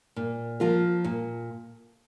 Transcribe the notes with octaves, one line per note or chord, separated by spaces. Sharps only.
A#2
F3 A#3 F4 A#4
A#2